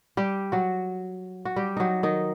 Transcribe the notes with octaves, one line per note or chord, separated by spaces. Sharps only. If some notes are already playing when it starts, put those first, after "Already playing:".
G3 G4
F#3 F#4
F#4
G3 G4
F#3 D#4 F#4
D#3 D#4